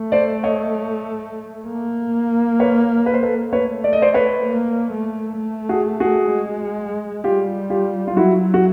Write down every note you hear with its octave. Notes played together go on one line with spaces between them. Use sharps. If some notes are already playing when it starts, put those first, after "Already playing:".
Already playing: A3
C5 D5
C#5 D#5
A#3
B4 C#5
B4
C5
A4 B4
A3 B4 C#5
D5
D#5
C5 D5
B4 C#5
A#3
A3
A3
F#4 G#4
F#4 G#4
G#3
G3 F4 G4
F4 G4
F4
F#3 E4 F#4
F#4